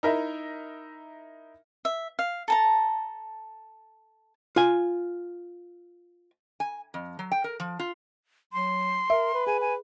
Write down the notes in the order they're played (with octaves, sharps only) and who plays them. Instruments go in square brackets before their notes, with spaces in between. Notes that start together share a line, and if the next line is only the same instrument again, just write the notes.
[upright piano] D#4 E4 A#4 E5
[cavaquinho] E5
F5
A4 A5 A#5
[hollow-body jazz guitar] F4 G#5
[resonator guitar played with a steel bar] G#5
F2
F#3
G5
A#4
F3
F4
[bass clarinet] F#3 [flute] C6
[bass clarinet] A#4 [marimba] E5
[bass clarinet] B4
[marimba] G#4 [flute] G#5
[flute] G#5